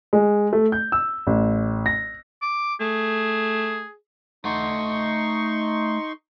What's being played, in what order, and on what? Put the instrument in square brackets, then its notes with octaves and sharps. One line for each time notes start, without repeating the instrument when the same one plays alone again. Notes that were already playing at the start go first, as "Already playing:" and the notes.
[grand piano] G#3
A3
G6
E6
A1
A#6
[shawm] D6
[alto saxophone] A3 [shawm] G#4
[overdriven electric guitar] A3 F#5 [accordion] D#4 C6 C#6